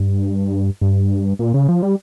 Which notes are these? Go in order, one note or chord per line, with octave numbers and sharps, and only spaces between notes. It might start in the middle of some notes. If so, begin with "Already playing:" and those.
Already playing: G2
G2
A#2
C#3
F3
G3